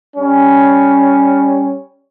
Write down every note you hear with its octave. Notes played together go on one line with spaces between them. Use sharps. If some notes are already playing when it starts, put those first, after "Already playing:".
G3 C#4